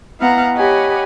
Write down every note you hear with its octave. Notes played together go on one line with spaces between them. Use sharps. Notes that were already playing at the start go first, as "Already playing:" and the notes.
B3 E4 F5 F#5 A#5
G4 C#5 D#5 F#5 G#5 B5